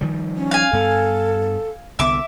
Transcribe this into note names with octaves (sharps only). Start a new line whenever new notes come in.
D#3 F3 G3
C#4
F5 G#5
G2 B3 A4
C2 D3 B3 E5 D6